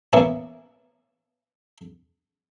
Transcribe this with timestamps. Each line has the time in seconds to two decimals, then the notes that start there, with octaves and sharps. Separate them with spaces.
0.13 E3 A#3 B3 C#4 E4